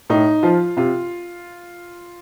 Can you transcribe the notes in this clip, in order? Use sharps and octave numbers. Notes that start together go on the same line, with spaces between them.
A2 D#4
F3 F4
C3 F4